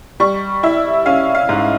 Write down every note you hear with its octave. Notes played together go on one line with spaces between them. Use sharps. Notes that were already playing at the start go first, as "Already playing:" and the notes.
G3 C#6
E4 E5
C#4 F5
F5
G#2